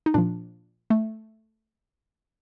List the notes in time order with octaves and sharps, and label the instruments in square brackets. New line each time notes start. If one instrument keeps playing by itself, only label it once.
[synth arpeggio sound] D#4
A#2 F3 D4
A3